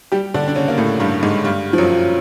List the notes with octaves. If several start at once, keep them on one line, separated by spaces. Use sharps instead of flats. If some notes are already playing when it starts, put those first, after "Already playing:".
G3 G4
D3 D4
D4
C#3 C#4
A#3
A2 A3
G2 G3
G#2 G#3
G2 G3
F3
F#2 F#3